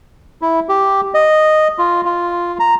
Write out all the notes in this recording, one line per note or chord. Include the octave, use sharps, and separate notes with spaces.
E4
G4
D#5
F4
F4
A#5